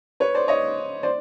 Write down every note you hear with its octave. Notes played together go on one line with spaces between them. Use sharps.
B4 C#5
C5 D5
C#5 D#5
C5 D5